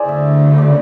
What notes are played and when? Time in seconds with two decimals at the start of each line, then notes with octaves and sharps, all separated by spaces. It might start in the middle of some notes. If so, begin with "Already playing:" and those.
Already playing: E4 G#4 C5 D5
0.09 D2 D3 A3 E5
0.58 D5